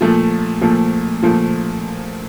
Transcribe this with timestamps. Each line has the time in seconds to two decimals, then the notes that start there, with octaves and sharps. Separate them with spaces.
0.01 A#2 F3 A3
0.61 A#2 F3 A3
1.22 A#2 F3 A3